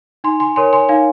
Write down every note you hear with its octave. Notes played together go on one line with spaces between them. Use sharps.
D#4 G#5 C6
G#5 C6
A#4 C#5 G#5 C6
G#5 C6
D#4 F5 G#5